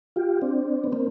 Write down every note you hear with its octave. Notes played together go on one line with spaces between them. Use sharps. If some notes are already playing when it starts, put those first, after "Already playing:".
F4 G4
C4 D4
B3
A#3 C4